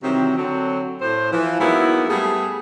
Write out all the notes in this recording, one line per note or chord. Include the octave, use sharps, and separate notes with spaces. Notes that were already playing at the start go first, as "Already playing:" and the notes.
C3 D#3 E3 F#3 G3 C4
D3 F#3 C4
A2 C5
E3 F3
G#2 F#3 A#3 B3 E4
G3 A3 B3 G#4